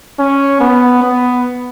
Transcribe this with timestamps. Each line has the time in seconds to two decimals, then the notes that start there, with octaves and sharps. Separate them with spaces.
0.19 C#4
0.61 B3
1.02 B3